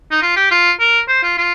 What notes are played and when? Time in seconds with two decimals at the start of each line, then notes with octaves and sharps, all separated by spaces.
0.11 D#4
0.22 F4
0.36 G4
0.51 F4
0.80 A#4
1.09 C5
1.23 F4
1.38 F4